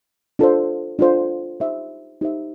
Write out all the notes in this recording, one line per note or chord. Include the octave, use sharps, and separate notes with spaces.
D4 F4 A4 C5
D4 F4 A4 C5
D#4 G4 C5 E5
D#4 G4 C5 E5